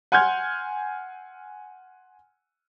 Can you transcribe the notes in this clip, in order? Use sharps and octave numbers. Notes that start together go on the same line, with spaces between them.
F#5 G#5 C6 F6 G6 G#6